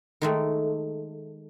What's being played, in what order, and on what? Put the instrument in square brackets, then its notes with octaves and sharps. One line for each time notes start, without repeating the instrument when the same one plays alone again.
[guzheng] D#3 G#3 A3